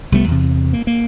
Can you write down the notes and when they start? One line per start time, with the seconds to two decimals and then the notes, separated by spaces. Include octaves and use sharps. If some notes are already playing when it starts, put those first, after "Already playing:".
0.12 C2 G3 A3 B3
0.28 E2 C3
0.73 A#3
0.87 A#3